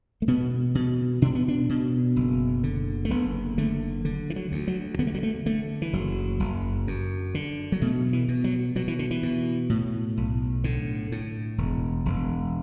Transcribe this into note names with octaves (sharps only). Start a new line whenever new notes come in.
A3
B2 B3
B2
B2 D4
B3
D4
B2
F#1
D3
A3
F#1 B3
D3 A3
D3
E3
F#3
D2
F#3
D3 B3
A3
F#3
A3
D3 A3
E3
F#1 F#3
F#1
F#2
D3
F#3
B2 A3
E3
B2
F#3
B2 F#3
E3
D3
E3
B2
A2
B1
A2 D3
A2
E1
E1